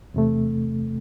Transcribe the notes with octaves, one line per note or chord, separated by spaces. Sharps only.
E2 C3 A3